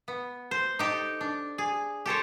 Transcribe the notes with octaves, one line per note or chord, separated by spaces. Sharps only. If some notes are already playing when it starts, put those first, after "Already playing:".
B3
C5
D#4 G4 A4
D4
G#4
G4 A4 C5 C#5